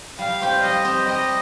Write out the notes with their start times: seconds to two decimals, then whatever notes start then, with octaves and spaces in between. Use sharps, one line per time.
0.19 G3 F5
0.41 C4 G4
0.63 G3 D#5
0.85 C4 G4
1.06 G3 D#5